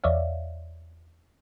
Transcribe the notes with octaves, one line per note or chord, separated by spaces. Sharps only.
E2 C#5 D5 E5 F5